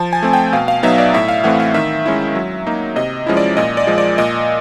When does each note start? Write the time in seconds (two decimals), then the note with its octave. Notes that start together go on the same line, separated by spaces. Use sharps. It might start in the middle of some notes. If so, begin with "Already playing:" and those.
Already playing: F3 A5
0.13 G#5
0.22 A3 C4
0.33 G5
0.52 B2 F5
0.68 F5
0.83 F#3 B3 D#4 E5
0.98 D5
1.14 A2 E5
1.28 F5
1.44 E3 A3 C4 F#5
1.60 F5
1.74 D#3 E5
2.06 G#3 C#4 E4
2.35 F#3
2.67 A#3 D#4
2.96 C3 D#5
3.26 F3 G#3 C#4 E4
3.37 D5
3.57 A#2 D#5
3.77 D5
3.87 F3 G#3
3.98 D5
4.18 A#2 D#5